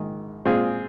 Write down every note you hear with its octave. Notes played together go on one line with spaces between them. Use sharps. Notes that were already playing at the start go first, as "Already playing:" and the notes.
Already playing: A#1 G#2 D#3
A#2 G#3 C4 F4 G#4